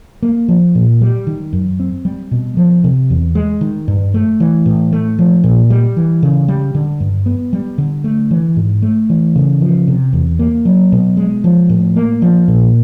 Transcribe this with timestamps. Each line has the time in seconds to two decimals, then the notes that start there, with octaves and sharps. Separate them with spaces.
0.23 A#3
0.48 F3
0.75 A#2
1.01 G3
1.27 D#3
1.53 F#2
1.80 C4
2.05 G3
2.31 B2
2.57 F3
2.84 C3
3.10 E2
3.35 G#3
3.61 D#3
3.88 G2
4.14 A3
4.40 E3
4.66 A2
4.93 A3
5.19 F3
5.44 A#2
5.70 G3
5.97 E3
6.23 C#3
6.48 G3
6.75 D3
7.00 G2
7.26 B3
7.53 G3
7.78 D3
8.04 A3
8.31 E3
8.56 G#2
8.82 A3
9.10 E3
9.36 C#3
9.61 F3
9.88 C3
10.13 E2
10.39 A#3
10.65 F#3
10.92 B2
11.17 G#3
11.44 F3
11.69 A2
11.96 A#3
12.22 F3
12.48 A#2